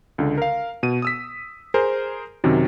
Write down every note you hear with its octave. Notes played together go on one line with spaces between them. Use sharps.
C#2 D3
A#4 F5
B2 D#7
D#6 E6 B6
G#4 A#4 C5
F#2 C3 D#3 F#4